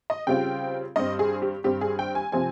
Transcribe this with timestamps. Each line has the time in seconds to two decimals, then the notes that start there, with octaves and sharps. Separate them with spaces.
0.10 D#5
0.27 C#3 G3 C4 F4 G5
0.96 G2 G3 C4 D#5
1.19 G#4
1.42 G4
1.64 G2 G3 C4 G4
1.81 G#4
1.99 G5
2.15 G#5
2.32 C3 F3 C4 G#5